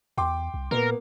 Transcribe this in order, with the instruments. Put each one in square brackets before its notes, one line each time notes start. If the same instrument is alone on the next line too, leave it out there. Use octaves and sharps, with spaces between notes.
[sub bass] E2 [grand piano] G5 C6 D6
[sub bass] C2
[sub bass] A#2 [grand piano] A#3 B3 [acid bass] A#4